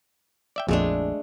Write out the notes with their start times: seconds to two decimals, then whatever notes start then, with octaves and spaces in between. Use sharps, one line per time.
0.56 D5 E5 G5
0.69 A#1 F2 G#3 A3 D4